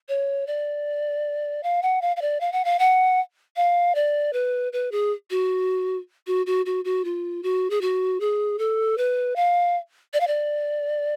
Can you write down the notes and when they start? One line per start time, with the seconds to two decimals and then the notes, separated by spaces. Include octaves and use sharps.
0.09 C#5
0.47 D5
1.63 F5
1.82 F#5
2.02 F5
2.17 F5
2.21 D5
2.41 F5
2.52 F#5
2.65 F5
2.79 F#5
3.56 F5
3.95 D5
4.33 B4
4.73 B4
4.92 G#4
5.30 F#4
6.27 F#4
6.46 F#4
6.66 F#4
6.85 F#4
7.05 F4
7.43 F#4
7.70 G#4
7.81 F#4
8.20 G#4
8.59 A4
8.98 B4
9.36 F5
10.14 D5
10.20 F5
10.27 D5